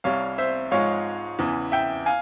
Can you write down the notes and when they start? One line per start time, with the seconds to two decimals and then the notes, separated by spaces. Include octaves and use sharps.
0.04 C2 C3 G3 C#5 F5
0.38 C5 E5
0.71 G#2 F3 G#3 C#5 F5
1.39 E2 C#3 E3
1.72 E5 G5
2.06 F5 G#5